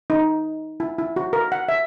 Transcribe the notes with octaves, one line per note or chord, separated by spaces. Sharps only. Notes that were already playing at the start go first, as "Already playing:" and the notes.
D#4
E4
E4
F#4
A#4
F#5
E5